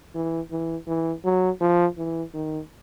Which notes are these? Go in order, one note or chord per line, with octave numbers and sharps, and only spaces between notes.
E3
E3
E3
F#3
F3
E3
D#3